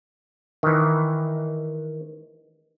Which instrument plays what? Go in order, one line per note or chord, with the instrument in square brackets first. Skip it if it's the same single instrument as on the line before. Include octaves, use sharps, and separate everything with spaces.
[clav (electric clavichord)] D#3 E3